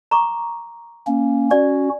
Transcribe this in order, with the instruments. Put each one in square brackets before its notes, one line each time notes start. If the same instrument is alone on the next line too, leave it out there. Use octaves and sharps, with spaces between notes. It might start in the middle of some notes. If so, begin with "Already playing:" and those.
[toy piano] A#5 C#6 D6
[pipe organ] A#3 C#4
[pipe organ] C#4 F#4 [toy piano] D5